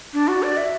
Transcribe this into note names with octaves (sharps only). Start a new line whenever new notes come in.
D4
F#4
D5
E5